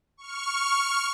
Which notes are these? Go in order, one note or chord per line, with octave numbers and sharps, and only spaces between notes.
C#6 F6